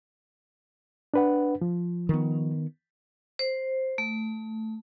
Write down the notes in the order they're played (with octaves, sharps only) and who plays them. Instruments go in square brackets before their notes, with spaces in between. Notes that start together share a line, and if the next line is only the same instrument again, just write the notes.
[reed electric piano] D4 B4 F#5
F3
[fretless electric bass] D#3 B3
[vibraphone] C5
A3